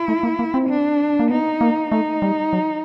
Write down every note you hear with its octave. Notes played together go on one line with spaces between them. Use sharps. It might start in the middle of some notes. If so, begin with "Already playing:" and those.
Already playing: E4
A3
A#3
A#3
C4
D4
A#3
B3 D#4
A#3
A3 D#4
G3
F#3